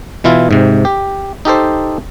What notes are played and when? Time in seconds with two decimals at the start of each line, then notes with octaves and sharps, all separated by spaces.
0.24 B2 E3 E4 F4
0.51 G#2 C3
0.85 G4
1.45 D#4 G4 A4 C5